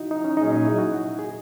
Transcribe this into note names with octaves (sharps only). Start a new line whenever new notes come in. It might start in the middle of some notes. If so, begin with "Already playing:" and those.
Already playing: D#4 E4 F#4
D#4
C#4
A#2 F#3 C#4 D#4 G#4
D#4
E4
F#4
G#4